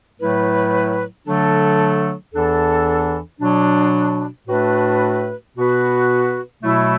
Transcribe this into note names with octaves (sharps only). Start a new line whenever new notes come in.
A2 F#3 A3 E4 B4
D3 F#3 A3 D4 A4
E2 E3 D4 A4
B2 F#3 D4
A2 A3 D4 F#4 B4
B2 B3 F#4 B4
B2 F#3 A3 E4